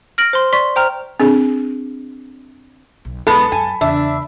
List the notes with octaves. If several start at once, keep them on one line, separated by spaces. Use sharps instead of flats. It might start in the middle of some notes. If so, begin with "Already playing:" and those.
F6 A#6 D7 F#7
C5 C6
D5 C6 C#6 B6
C5 G5 A#5 F6
C4 D4 G#4
B1
B1 G#3 B3 A4 B5
F#2 G#5
E2 C#3 D4 E5